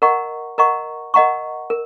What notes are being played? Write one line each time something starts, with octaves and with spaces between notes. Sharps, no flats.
A#4 D#5 F#5 A#5 C#6
A#4 D#5 F#5 A#5 C#6
A#4 D#5 F#5 A#5 C#6
A#4